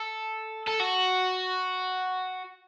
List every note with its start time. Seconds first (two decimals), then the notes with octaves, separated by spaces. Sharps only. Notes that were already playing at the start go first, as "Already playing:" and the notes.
Already playing: A4
0.67 A4
0.80 F#4